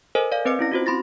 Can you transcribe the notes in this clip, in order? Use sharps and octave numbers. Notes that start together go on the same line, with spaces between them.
A4 A#4 C5 D#5 G#5
D5 F5
C4 B4 D#5 D6 C#7
C#4 E4 A#6
F4 F#4 C5
C4 B5 C6 A6 A#6